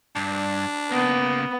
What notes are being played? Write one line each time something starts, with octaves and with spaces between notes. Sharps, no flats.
G2 D4
C#3 A#3 B3